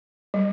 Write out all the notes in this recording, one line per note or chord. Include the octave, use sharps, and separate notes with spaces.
G3